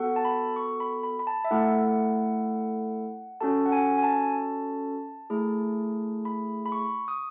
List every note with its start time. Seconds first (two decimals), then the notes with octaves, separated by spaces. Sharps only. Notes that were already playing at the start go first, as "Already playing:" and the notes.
Already playing: B3 F#4 A4 F#5
0.16 A5
0.25 B5
0.56 C#6
0.80 B5
1.03 B5
1.19 B5
1.27 A5
1.45 E5
1.51 A3 E4 A4 F#5
3.40 C#4 F#4 A4 A5
3.66 F#5
3.72 G#5
3.98 G#5
4.03 A5
5.30 A3 E4 G#4
6.25 B5
6.66 B5
6.72 C#6
7.08 D#6